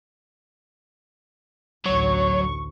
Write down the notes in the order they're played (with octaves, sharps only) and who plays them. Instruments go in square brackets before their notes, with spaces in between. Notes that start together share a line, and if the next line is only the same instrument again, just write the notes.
[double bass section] A1 D2 [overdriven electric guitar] F#3 [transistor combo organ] C#5 [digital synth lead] C#6